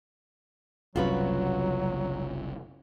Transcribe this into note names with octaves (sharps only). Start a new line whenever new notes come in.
F#1 C2 C#3 F#3 F4 F#4 B4